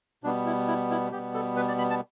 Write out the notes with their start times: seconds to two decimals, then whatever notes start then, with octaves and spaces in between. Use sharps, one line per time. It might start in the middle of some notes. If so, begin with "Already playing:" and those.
0.23 B2 G3 B3 D4
0.46 E4
0.67 E4
0.91 E4
1.12 B2 G3 B3 G4
1.34 A4
1.56 B4
1.68 D5
1.78 B5
1.90 A5